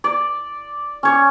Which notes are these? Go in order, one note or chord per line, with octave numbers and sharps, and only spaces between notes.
D5
C#4 C#5